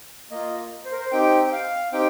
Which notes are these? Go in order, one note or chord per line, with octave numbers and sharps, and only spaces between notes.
A#3 F4 D#5
C5
A#4
C5
C4 D#4 G4 G5
G5
F5
C4 D#4 G4 G5